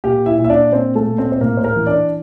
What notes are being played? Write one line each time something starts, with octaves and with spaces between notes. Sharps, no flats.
A#2 G4
E4 E5
A#2
E5
D4 D5
A#2 C4 C5
A3 A4
A#2
C4 C5
C5
A2 A#3 A#4
C5
A#3 A#4
E3
D4 D5